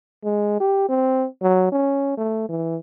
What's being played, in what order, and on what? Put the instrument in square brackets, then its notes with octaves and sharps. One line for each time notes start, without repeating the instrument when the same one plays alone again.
[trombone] G#3
G4
C4
F#3
C#4
A3
E3